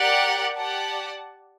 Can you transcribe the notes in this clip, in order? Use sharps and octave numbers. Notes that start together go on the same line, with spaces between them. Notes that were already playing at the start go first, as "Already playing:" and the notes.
Already playing: G4 A#4 D5 F#5
G4 D5 F#5 A5